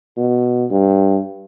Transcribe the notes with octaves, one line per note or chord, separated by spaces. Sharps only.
B2
G2